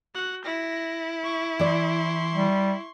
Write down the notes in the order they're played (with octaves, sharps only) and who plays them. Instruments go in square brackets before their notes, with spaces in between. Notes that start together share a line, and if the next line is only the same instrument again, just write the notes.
[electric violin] F#4 F#5
[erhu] E4 [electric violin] A#6
[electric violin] C#6
[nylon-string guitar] E3 D5 [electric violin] C6 C#6
[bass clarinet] G3